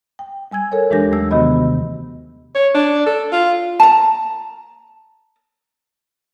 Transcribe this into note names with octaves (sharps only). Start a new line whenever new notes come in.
G5
G3 G#5 E6 G#6
A4 A#4 C#5
D#2 E3 G#3 D4 G4 A#6
D#2 E3 F#3 A3 E6
C3 D#3 B3 F#4 D#5 B5
C#5
D4
A4
F4
A5 A#5